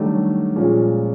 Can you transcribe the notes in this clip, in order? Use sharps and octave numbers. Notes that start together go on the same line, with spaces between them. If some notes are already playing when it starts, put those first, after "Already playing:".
Already playing: D#3 F#3 G3 A3 D4
A#2 F3 G#3 C#4